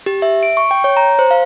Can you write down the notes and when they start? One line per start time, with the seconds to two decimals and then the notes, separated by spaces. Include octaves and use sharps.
0.06 G4
0.22 E5
0.43 D7
0.57 C#6
0.71 G5
0.84 C#5
0.97 A#5
1.19 C5
1.31 F5